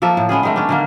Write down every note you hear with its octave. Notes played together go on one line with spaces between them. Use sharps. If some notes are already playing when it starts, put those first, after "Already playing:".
F3 A#3 A4 E5
A2
G#3 B3 C#4 G#4
D#3 G#3 A3
C#4 D4
D3 D#3 A#3